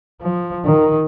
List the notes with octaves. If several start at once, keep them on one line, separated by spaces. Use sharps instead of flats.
F3
D#3